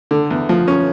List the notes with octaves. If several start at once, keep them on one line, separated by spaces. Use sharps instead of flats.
D3
E2
F3
C#4